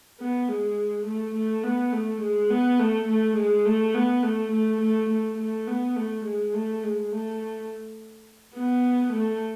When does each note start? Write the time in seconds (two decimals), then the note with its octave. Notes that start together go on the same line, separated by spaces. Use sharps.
0.20 B3
0.49 G#3
1.06 A3
1.35 A3
1.64 B3
1.93 A3
2.22 G#3
2.50 B3
2.80 A3
3.08 A3
3.37 G#3
3.65 A3
3.94 B3
4.23 A3
4.52 A3
4.81 A3
5.10 A3
5.38 A3
5.67 B3
5.96 A3
6.25 G#3
6.54 A3
6.83 G#3
7.12 A3
8.55 B3
9.13 A3